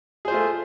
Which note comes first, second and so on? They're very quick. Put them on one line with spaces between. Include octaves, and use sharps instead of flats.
G#4 C5 F4 A3